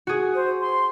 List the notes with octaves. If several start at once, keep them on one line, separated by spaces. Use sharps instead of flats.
F#4 G#4
C5
C6